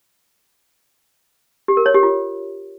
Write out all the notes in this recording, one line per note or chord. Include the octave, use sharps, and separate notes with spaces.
G4
A#4
C#5
G4
F4